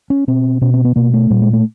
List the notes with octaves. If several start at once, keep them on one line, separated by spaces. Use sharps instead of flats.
C#4
B2 C4
B2 C#4
C4
B3
B2 A#3
A3
A#2 G3
G#3
A3